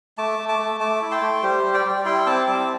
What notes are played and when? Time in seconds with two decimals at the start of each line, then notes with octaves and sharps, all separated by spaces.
0.18 A3 A5 D6
0.39 A3
0.49 A5 D6
0.59 A3
0.80 A3 A5 D6
1.02 E4
1.11 G5 C6
1.22 A3
1.43 G3 G4 C5
1.64 G3
1.74 D5 G5
1.85 G3
2.05 E4 G5 C6
2.26 C4 A5 D6
2.47 G3 A5 D6